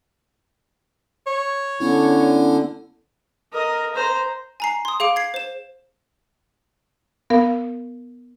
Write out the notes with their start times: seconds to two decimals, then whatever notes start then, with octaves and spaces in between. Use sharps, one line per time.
1.27 C#5
1.80 D3 B3 C#4 E4
3.53 A#4 D#5
3.94 C5 A#5
4.60 G#5 A#5 C7
4.85 C6 D#6
5.00 G#4 F5 D6 D7
5.16 G#6 C7
5.34 C5 E7
7.30 B3 A#4 F5